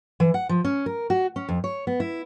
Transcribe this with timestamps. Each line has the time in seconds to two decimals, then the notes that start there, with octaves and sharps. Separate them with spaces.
0.20 E3
0.34 F#5
0.49 F3
0.64 C#4
0.86 A#4
1.10 F#4
1.36 C#4
1.49 F2
1.64 C#5
1.87 B3
2.00 E4